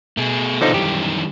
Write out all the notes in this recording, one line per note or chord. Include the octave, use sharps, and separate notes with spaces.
B2 A3 G#4
D3 E3 F3 G3 C#4 D#4
F#2 D#3 G4